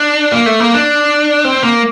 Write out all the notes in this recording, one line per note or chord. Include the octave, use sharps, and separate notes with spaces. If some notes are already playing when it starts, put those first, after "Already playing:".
Already playing: D4
A#3
A3
A#3
D4
C4
A#3